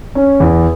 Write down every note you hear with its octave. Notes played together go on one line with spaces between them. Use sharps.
C#4
E2